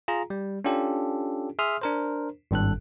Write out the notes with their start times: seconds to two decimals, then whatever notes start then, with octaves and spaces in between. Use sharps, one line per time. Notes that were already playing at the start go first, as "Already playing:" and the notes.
0.08 F4 G#4 A#5
0.30 G3
0.64 C#4 D4 F4 G4 A4
1.59 G#4 E5 C6 D#6 F6
1.81 D4 A#4 C5
2.51 G#1 G2 A4 F#6